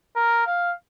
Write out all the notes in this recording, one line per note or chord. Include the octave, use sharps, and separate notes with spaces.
A#4
F5